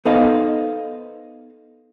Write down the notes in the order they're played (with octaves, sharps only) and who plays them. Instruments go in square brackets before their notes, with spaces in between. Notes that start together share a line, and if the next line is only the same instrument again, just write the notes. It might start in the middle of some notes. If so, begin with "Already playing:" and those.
[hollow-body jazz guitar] B3 D#4 A4 C5 D#5 F5